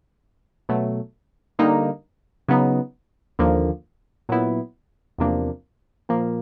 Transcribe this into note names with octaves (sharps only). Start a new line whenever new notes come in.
B2 F#3 A3
D3 G3 A#3 D#4
C#3 F#3 B3 D#4
D#2 D3 F3 A#3
A#2 F#3 B3 E4
E2 C3 F3 A#3 D4
A#2 F3 A#3